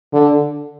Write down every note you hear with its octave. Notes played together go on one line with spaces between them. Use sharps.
D3